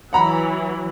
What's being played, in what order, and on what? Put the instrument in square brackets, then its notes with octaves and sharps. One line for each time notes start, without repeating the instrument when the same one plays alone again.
[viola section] E3 F#3 [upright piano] F#5 A#5 B5